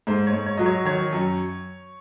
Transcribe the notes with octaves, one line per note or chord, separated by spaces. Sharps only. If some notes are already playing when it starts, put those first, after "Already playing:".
G#2 C5
C#5
G#2
C#5
F#3 D#5
C#5
D#3 C#5
F#2